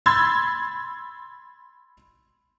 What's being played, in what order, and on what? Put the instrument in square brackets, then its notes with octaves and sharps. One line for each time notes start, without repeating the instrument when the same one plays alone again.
[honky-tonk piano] B5 C6 E6 G#6 A6